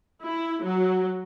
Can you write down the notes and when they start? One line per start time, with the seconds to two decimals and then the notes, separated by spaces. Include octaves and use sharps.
0.24 E4
0.64 F#3